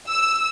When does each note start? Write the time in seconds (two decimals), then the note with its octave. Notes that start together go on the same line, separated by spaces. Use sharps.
0.10 E6